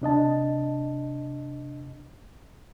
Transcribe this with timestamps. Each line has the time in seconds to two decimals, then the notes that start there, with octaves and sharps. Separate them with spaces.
0.02 C3 D4 D#5 A5